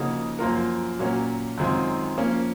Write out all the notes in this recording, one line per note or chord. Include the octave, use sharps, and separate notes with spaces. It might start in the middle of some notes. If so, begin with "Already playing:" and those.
Already playing: C#3 F3 A#3 D#4 F#4
F#2 F3 A#3 F4 A#4
A#2 F#3 A#3 C#4
F#2 D#3 G#3 C4 F4
F3 A#3 C#4